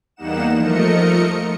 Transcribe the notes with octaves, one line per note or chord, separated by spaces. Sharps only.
E2 G3 A#3 D#4 F#5 E7
F3 A3 A#4 D#5 C#7